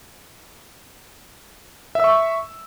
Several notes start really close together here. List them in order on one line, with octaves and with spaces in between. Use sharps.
E5 E6 C#6